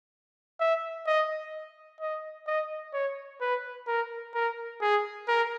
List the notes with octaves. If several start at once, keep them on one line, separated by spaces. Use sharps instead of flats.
E5
D#5
D#5
D#5
C#5
B4
A#4
A#4
G#4
A#4